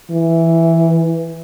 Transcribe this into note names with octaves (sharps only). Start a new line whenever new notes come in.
E3